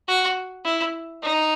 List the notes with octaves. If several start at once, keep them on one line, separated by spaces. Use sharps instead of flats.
F#4
E4
D#4